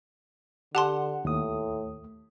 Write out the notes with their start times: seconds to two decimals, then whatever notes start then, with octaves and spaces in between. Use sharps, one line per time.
0.75 D3 G4 F#5 A5 C6
1.25 D#2 A2 A3 D#6